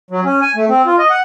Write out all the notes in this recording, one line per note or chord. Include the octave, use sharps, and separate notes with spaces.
F#3
C#4
G#5
A3
C4
F4
D#5
F#5